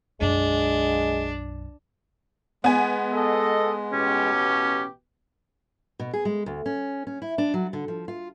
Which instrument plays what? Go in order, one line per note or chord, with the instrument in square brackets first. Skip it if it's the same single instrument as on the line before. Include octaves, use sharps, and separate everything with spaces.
[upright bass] B1 F#2 [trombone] G#3 [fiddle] D4
[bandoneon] G#3 [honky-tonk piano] B3 G#5
[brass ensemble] A4 D#5
[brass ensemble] A1 B2 G4 [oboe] C#4
[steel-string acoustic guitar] B2
G#4
G#3
D2
C#4
C#4
E4
D4
F#3
D3
F3
F4